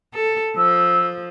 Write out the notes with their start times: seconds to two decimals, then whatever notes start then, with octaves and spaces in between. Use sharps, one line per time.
0.14 A4
0.57 F3 E6